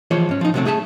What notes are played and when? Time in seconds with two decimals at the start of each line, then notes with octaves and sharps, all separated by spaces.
0.11 E3 F3 G#3 F4 C5 C#5
0.29 G#2 C#4
0.41 F3 D#4
0.54 C3 F3 F#3 G#3 A3 C4
0.65 A3 G#4 E5 A5